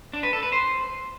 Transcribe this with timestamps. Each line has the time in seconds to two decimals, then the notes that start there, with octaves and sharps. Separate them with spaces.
0.13 D4
0.23 B4
0.33 A4
0.43 B4
0.52 C5